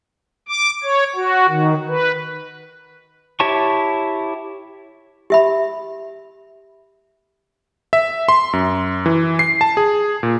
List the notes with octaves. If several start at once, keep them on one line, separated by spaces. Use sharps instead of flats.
D6
C#5
F#4
D#3
B4
E4 G4 C#5 A5 C#6
G4 E5 B5
E5
C6
F#2
E3
C7
A5
G#4
A#2